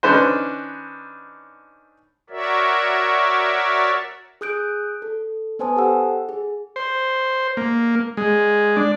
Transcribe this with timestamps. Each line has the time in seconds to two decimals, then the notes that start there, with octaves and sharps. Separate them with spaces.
0.03 D#3 C#4 D4 B4 C5
2.30 F#4 A#4 C#5 D5 E5
4.41 G#4 D#6 F#6 G6 D7
5.02 A4
5.59 B3 B4 C5 G#5 A5 D#6
5.76 G4 A4 F#5 E6
6.29 G#4
6.76 C5
7.57 A#3
8.17 G#3
8.76 D4